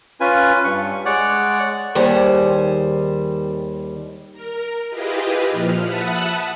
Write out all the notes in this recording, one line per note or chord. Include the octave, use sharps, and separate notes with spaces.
C#4 F4 B4 G#5
G2 C#6
G#3 C#5 D5 F#5
D#2 D#3 G3 G#4 C5
A#4
E4 F4 G4 G#4 B4 D#5
A#2 F3 F6
E5 F#5 A5 B5 D#6 F#6